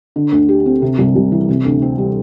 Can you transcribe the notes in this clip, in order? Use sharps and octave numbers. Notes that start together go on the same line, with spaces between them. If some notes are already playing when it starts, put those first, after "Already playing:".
D3
D2
G4
C4
C3
C2
C2
E3
C3
D2
C4
G3